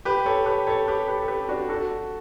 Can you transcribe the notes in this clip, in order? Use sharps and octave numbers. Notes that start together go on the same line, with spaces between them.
G4 B4
A4 C#5
G4 B4
A4 C#5
G4 B4
G4 B4
A4
G4 B4
D4 F#4
F#4 A4